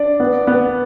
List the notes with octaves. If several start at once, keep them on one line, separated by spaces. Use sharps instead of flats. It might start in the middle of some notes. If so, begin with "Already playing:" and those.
Already playing: D4 D5
B3
B3